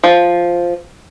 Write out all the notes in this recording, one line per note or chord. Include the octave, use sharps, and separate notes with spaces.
F3